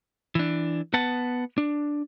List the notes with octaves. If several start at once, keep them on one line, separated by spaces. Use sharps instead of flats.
E3 D4
B3 B4 F#5 A5
D4